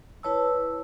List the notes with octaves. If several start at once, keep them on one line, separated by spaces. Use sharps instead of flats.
E4 B4 C#5 A5 E6